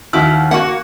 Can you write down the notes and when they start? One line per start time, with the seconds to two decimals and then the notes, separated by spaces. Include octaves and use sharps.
0.13 D#2 E4 F#4 F6
0.51 A#3 F#4 F#5